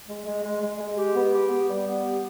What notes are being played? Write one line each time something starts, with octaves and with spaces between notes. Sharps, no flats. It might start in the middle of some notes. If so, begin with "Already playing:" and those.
G#3
G#3
G#3
G#3
G#3
G4
B3
G4
B3
G3
B3
G4